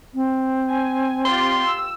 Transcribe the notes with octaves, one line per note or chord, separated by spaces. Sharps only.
C4
G#5
F4 G4 D5 C6
E6